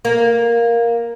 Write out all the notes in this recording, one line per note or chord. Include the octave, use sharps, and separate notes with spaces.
A#3